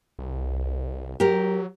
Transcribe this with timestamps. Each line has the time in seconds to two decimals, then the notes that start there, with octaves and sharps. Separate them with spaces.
0.19 C2
1.20 F#3 G4 A#4